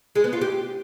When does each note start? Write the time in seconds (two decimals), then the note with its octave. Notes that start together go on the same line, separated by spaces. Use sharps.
0.15 G#3
0.24 B3
0.33 F4
0.41 G4